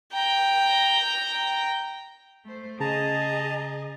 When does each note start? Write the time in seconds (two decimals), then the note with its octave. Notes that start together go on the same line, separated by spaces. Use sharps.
0.13 G5 A#5
2.45 A3 C5
2.80 C#3 G#4 D#5 A5 A#5